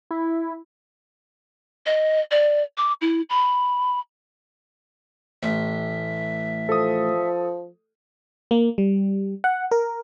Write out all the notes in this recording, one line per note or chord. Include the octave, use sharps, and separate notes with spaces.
E4
D#5
D5
D6
E4
B5
A1 E5
F3 A4 D#6
A#3
G3
F#5
A#4